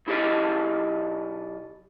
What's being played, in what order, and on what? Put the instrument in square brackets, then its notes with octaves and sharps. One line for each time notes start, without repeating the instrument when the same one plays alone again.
[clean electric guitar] B1 E4 G4 A4 D#5